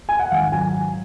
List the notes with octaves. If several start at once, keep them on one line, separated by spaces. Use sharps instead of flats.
G#5
F#5
G#1 F5
F#3 G#5